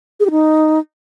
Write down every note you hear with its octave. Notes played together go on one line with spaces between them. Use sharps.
G#4
G4
D#4